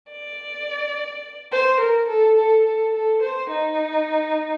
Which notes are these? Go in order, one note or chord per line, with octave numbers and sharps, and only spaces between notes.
D5
C5
A#4
A4
A4
A4
A4
C5
D#4